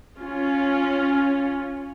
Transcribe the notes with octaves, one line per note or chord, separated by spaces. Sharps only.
C#4 F4